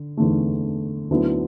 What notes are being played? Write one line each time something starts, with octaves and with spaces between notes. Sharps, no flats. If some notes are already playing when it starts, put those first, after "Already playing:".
Already playing: D3
E2 D3 A3
D2 D3 F#3 B3 E4